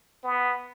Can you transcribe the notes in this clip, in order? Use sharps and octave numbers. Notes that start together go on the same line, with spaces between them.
B3